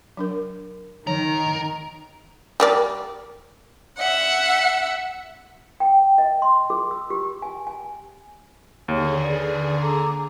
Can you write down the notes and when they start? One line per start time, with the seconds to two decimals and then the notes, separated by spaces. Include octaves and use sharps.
0.17 F#3 D4 A#4
1.07 D#3 A#4 C#5
2.60 G3 A#4 D5
3.98 E5 F#5
5.80 G5
6.18 D#5
6.42 C6
6.70 G#4
6.91 E6
7.10 G4
7.42 G#5
7.67 G#5
8.88 D#2 D3 G#4 C#5
9.22 B4 D5
9.81 A4 A#5 D6